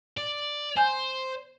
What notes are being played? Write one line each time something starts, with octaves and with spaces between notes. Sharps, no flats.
D5
C5 G#5 G6